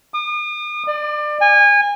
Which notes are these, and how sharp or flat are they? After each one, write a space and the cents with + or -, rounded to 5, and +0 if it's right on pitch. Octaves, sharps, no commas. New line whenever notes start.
D#6 -45
D5 +30
G#5 -25